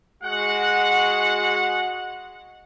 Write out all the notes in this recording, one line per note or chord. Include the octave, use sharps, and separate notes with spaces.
G#3 F#4 F#5